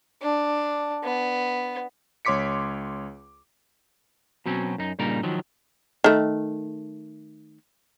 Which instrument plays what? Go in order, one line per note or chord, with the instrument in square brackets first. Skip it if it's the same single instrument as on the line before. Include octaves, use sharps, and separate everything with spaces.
[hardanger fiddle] D4
B3
[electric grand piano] C#2 C#5 C6 D6 B6 C#7
[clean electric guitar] B2 F#3 C4 C#4
F#2 D#4
G2 A#2 C#3 G3 D#4 A#4
D#3 F3 F#3
[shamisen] D#3 A3